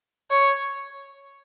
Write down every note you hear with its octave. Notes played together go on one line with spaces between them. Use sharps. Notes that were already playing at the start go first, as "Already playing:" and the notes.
C#5